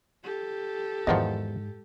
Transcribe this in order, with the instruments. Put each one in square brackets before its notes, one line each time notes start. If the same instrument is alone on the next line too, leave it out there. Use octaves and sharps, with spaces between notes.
[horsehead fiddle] G4 A4
[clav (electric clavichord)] E2 D#3 F3 [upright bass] G#2 [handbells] D#5 F#5